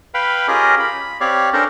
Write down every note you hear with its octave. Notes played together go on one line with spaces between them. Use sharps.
B4 F5 G5 B5
C#4 F4 G4 G#4 A#4 D#5
B5
C4 G4 C#5 D5 F5
C#4 D4 A4 A#4 C5